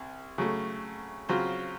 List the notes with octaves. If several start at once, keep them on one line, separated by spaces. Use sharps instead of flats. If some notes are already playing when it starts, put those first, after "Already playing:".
Already playing: C2
C#3 F#3 A3
C#3 F#3 C4 F4 C5